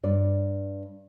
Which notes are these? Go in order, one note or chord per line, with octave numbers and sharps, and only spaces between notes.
G2 D5